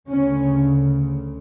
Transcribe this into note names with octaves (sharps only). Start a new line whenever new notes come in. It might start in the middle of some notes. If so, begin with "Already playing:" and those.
D2 C#3 C#4